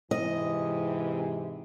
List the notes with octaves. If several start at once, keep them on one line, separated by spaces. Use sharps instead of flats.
G#2 C3 E3 D#5